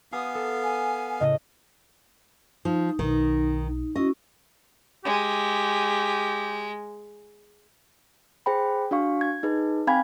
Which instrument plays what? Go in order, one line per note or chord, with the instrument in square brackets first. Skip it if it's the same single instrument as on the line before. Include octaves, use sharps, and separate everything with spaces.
[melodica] B3 F5 [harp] G4 G#5 D#6
[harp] A4
[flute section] G#5
[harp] A2 C#3 [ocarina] D#5
[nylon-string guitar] F3 [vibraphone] D#4
[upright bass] B1 [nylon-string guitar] D#3
[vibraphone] C#4 E4 F#4 [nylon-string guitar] D#5
[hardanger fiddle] G#3 [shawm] G4
[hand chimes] G#4 C5 G5 B5
D4 F#4 F5 C#6
G#6
D#4 G#4 B4
C4 F5 G5 G#5 B5 G#6